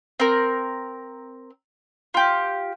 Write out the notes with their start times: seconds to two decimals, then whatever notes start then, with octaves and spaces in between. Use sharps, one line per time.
0.20 C4 A#4
2.14 F4 G4